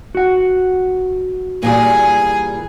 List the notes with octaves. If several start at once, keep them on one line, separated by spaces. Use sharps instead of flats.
F#4 F#5
A#2 E3 G3 G#4 G#5